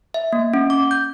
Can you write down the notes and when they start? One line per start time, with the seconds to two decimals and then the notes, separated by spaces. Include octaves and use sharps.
0.14 E5
0.33 A#3
0.54 C#4
0.70 D6
0.91 G6